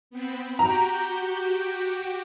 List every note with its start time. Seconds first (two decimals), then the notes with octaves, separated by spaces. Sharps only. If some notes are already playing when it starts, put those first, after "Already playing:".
0.11 B3 C4 B5
0.59 F#4 G4 G5 A#5